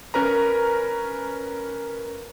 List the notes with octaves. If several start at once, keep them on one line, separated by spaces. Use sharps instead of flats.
C#4 A#4 B4 A#5